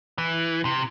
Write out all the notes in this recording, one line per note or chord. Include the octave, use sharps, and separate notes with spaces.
E3
C3